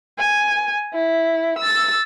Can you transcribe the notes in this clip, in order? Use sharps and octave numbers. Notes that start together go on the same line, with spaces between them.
G#5
E4
E6 A6